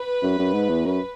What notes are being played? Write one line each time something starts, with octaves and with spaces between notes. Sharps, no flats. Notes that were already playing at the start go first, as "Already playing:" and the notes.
Already playing: B4
F#2
F#2
G#2
E2
F#2 B4